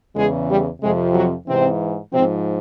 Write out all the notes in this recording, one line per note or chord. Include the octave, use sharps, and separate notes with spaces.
E2 C#3 E3 G#3 G#4
G3 G4
F2 C3 F3 G#3 G#4
F#3 F#4
G#2 C3 E3 C4
G#2 C3 F3 C4